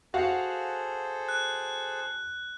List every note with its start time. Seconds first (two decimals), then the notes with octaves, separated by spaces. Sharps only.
0.14 F#4 G#4 A4 C5 F5 F#5
1.29 F#6